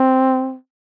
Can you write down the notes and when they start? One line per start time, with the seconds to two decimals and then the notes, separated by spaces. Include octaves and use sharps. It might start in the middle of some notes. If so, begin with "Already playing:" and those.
Already playing: C4